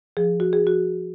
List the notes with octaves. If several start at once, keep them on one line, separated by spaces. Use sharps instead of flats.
F3 G#4
F#4
G#4
F3 F#4